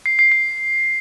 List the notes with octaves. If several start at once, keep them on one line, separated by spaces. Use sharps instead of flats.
C7
C7
C7